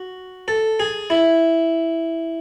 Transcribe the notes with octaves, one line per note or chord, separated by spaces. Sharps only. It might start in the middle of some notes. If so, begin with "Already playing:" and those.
Already playing: F#4
A4
G#4
E4